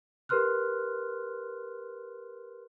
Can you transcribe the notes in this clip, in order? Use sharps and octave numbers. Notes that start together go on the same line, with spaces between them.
G4 A#4 B4 C6 F6 F#6